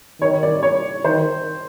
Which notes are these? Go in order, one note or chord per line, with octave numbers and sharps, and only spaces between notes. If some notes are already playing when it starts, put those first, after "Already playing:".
D#3 C#5
D5
C#5
D#3 C5